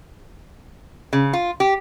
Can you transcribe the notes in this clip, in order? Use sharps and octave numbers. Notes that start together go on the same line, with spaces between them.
C#3
F4
G4